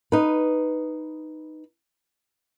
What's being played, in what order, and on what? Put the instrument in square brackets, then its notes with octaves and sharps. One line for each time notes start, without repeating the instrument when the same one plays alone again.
[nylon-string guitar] D#4 B4